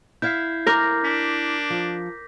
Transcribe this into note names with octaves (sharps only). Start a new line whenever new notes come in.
E4 E5 F5 G6 G#6 C7
A#4 D6 G6 A#6
D4 B6
F3